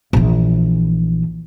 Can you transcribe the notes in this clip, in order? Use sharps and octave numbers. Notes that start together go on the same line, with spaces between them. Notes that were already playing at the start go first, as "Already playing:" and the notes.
A#1 E3